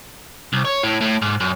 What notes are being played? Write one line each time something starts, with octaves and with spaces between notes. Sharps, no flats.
C2
C#5
A2
A2
G#2
F#2